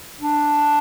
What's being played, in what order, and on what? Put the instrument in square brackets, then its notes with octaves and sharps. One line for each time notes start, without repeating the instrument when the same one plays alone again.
[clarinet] D4